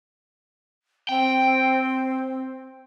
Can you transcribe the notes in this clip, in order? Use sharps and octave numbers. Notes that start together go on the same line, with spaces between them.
C4 G5